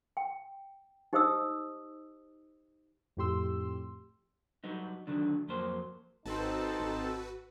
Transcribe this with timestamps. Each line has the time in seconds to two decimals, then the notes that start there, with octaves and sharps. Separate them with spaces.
0.17 G5
1.13 D#4 G4 C5 D#5 D#6 E6
3.17 F2 A2 G4 C6 E6
4.64 F#3 G3 B3 D#4
5.07 D2 A#2 D3 D#3 F#3 D4
5.48 F2 F#3 A#3 C5
6.26 G#1 C4 D#4 F#4 A4 B4 A5
6.80 G#1